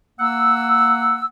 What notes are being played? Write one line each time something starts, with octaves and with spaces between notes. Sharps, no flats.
A#3 F#5 E6